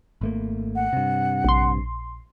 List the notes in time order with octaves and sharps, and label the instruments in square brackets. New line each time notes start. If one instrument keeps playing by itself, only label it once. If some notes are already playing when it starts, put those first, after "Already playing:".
[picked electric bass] G#1 A3 A#3
[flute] F#5
[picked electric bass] G2 C3
[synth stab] A#1 C6